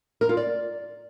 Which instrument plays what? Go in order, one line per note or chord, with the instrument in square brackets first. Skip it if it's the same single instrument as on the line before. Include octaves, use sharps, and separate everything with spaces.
[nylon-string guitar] A#4
F4
D5